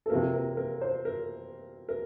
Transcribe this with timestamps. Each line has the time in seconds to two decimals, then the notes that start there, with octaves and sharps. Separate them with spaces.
0.06 A4
0.10 C3 F3 A#3 A#4
0.34 A#4
0.57 A#4
0.81 C5
1.05 A#4
1.89 A#4